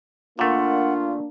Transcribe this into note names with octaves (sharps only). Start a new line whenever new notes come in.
A#2 A3 A#3 D4 F4 F#5